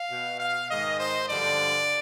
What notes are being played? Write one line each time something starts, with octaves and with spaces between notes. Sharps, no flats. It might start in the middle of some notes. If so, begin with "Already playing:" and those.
Already playing: F5
B2
F5
G#2 D#3 D#5
C5
G2 D3 F3 D5